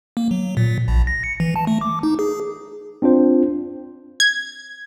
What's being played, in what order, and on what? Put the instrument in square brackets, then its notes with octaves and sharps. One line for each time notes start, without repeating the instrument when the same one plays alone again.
[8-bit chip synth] A#3
F#3
A#2
A#1
A#6
C#7
E3
A5
A3
D6
D#4
G#4
[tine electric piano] C4 D4 F4 C5
[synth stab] G#6